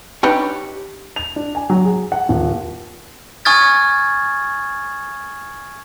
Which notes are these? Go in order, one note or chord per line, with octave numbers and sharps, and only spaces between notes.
D4 D#4 G4 B4 C#5
F7
D4
G#5
F#3
G#4
F#5
D#1
G#5 C#6 D#6 F6 G#6 A6